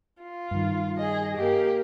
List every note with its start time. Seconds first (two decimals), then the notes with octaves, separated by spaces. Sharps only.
0.22 F4
0.51 G2 D#3
0.97 G#4 D#5
1.36 A#3 G4